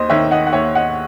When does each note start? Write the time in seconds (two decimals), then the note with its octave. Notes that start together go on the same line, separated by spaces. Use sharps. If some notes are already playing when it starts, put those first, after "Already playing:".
Already playing: D#2 C5 D#5
0.09 D#3 C#5 E5
0.31 D#5 F#5
0.46 F#5
0.53 D#2 C#5 E5
0.75 D#5 F#5